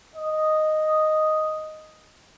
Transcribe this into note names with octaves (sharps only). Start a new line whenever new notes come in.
D#5